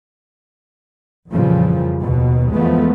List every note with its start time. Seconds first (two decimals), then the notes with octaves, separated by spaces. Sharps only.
1.31 F2 A#2 C#3 E3 F3 G3
2.01 D#2 B2
2.53 E2 F3 G#3 A3 B3